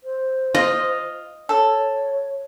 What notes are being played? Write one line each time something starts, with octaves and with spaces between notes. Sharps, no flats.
C5
F4 D#5
A4 C#5